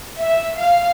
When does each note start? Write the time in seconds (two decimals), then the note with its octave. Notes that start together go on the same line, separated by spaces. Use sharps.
0.18 E5
0.58 F5